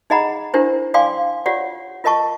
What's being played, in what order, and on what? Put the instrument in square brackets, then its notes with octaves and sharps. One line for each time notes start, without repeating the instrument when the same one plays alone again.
[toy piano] D#4 G#4 D#5 F#5 A#5 B5
D4 E4 G4 A#4 C5
D5 F5 G5 G#5 C6 D6
F4 G4 C#5 D5 F#5
F4 A#4 D#5 A5 C#6